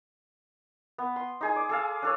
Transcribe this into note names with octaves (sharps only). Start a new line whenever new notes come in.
B3
C6
D#4 G#4 G#5
D5
G#4 A4 F5
D4 A4 C#5